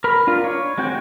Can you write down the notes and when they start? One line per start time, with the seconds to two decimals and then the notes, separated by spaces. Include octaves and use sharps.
0.04 A#4 B5
0.27 D4 F4
0.44 C#5
0.78 G#3 C4 F#4 G5